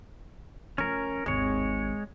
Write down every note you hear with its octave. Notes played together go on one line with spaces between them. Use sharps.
F3 A3 C#4 A#4
G#1 D#2 G#3 C#5